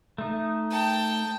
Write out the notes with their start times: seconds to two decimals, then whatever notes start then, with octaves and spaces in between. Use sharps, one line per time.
0.18 A3 D#4
0.71 G5 A5